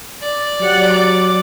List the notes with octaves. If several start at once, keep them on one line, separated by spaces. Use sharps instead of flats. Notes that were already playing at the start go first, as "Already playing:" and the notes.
D5
F#3 G4 F#5
D6